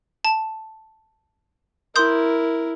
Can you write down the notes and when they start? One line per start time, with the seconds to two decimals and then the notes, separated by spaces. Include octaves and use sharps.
0.25 A5
1.96 E4 A#4 C6 D#6 G6